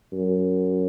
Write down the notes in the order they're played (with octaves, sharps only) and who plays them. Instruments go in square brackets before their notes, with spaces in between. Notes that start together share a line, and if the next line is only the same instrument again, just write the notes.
[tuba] F#2